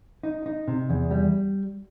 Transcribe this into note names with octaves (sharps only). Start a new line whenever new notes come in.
D#4
D#4
C3
E2
G3